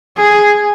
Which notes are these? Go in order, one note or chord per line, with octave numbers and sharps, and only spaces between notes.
G#4